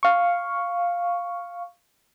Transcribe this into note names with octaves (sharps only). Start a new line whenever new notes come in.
F5 C#6